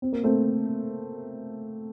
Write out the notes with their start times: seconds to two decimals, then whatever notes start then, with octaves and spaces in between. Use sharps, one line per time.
0.02 C4
0.12 A#3
0.24 A3 C4